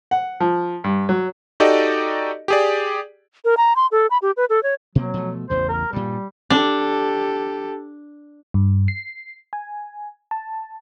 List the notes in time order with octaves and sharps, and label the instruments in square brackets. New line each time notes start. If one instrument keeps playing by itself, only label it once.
[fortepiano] F#5
F3
G2
F#3
[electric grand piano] D#4 F#4 G4 A4 D5 D#5
G4 G#4 D5
[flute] A#4
A#5
C6
A4
B5
G4
B4
A4
C#5
[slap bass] B2 A#3 C4 [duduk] F#3
[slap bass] B2 F3 A3
[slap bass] A1 E2 C#3 [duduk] C5
[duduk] A#4
[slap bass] G2 A#2 [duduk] G3
[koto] D4 [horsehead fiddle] G4 A4
[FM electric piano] G2
C7
G#5
A5